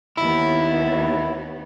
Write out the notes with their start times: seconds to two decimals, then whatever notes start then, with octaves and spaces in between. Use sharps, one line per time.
0.18 D#2 B3 E4